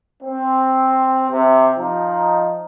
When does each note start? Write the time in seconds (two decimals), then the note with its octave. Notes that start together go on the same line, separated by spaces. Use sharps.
0.23 C4
1.30 C3
1.76 F3 D#4